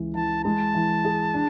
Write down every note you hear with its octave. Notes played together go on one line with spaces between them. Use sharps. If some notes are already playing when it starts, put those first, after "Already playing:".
Already playing: C#2 E3
E3 A5
G#3 A5
E3
G#4
D4